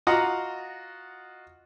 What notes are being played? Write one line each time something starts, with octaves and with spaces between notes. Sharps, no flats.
F4 F#4 D#5 F#5 A#5 D#6